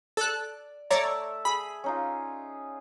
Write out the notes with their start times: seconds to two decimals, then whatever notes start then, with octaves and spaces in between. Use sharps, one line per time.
0.17 A4 D5 F#6
0.91 A3 C#5 D5 E5 A#5
1.45 G#4 B5
1.84 C#4 D#4 F4